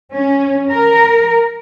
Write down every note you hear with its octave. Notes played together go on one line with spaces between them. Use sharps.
C#4
A#4